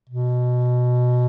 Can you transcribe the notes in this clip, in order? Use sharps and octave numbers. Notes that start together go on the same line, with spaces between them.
B2